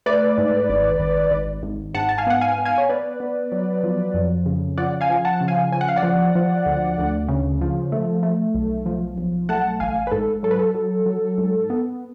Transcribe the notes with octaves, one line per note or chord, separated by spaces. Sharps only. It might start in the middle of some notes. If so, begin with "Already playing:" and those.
A3 B4 D5
G#2
G#1
G#1
G#1
G#1
G#2 F#5 A5
A5
F5 G#5
B3 F#5
F5 G#5
B3
F5 G#5
C#5
B3 B4 D5
B3
F#3
F3
F2
C#3
F3 D5 F#5
F5 G#5
F3
F#5 A5
C#3
F5 G#5
F3 G#5
F#5
F5
D5 F#5
F3
F3
D2
D2
C#3
F3
A3
A3
B1
F3
B1
A3 F#5 A5
A1 F5 G#5
B4
G#2 A4
F#3 A4
B4
A4
F#3
F#3
G#2
B3